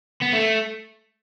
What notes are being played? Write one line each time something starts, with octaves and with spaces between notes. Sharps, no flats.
B3
A3